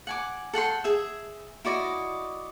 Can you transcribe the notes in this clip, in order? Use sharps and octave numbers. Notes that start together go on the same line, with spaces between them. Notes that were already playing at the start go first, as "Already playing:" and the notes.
F#5 G#5 D6
A4 F#5 G5 C6
G#4 E5
E4 F#4 D5 D#5